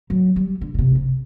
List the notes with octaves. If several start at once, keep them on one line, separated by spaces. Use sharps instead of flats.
F#3
G3
D3
C#3
C3
C3